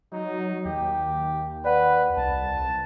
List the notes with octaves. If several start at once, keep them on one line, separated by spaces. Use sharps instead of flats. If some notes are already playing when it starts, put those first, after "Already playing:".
F#3 D#4
D#2 G4
B4 D5 F#5
C2 A5